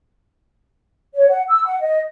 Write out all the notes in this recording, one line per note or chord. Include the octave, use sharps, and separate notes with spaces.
C#5
F#5
E6
F#5
D#5